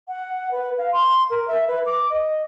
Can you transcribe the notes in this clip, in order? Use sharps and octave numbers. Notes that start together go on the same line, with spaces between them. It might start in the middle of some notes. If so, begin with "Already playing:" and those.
F#5
B4
F5
C6
A#4
E5
B4
D6
D#5